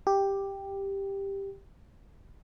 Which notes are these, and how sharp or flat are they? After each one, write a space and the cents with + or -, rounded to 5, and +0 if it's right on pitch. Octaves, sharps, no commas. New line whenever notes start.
G4 +5